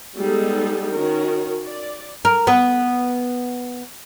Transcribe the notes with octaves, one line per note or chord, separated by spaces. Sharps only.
G3 G#3 B3 D#4 G#4 A4
D#3 C#4 F#4 A#4
D5
A#4
B3